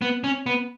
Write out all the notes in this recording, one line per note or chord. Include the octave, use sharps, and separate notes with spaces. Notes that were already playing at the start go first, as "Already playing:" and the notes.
B3
C#4
B3